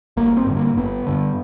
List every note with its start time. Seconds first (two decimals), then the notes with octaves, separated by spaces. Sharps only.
0.17 G1 A#3
0.37 C4
0.47 G2 D3
0.57 A#3
0.77 G1 B3
1.07 G2 D3